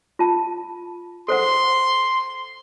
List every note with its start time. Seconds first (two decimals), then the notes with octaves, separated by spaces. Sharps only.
0.19 F4 A5
1.28 A4 C5 F#5 C6